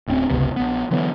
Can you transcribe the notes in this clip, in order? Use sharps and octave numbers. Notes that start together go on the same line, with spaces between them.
D1 D2 C4 C#4
F#1 C#2 C3 B3
A#1 B3
D3 E3 F#3 B3